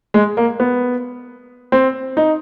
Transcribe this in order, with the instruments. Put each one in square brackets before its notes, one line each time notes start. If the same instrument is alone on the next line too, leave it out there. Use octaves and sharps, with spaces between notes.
[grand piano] G#3
A#3
B3
C4
D#4